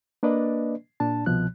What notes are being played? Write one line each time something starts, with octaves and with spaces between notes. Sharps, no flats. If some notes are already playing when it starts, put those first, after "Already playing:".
A#3 D4 B4 D5 D#5
A#2 D4 A5
C2 B2 F3 F#6